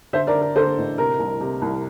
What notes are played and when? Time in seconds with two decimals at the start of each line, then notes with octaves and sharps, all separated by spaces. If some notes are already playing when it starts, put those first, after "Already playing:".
0.13 D3 C5 E5
0.27 A#4 D5
0.34 D3
0.41 A#4
0.56 D3 A4 C5
0.77 A1
0.98 C3 A#4
1.19 C2
1.41 C3
1.61 C2